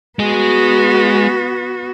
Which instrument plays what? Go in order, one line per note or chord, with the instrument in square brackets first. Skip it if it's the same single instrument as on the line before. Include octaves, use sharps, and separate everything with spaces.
[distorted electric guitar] G#3 G#4 [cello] B3 F#4